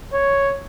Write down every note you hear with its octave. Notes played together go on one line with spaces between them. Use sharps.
C#5